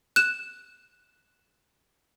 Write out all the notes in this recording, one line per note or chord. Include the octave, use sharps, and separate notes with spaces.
F#6 E7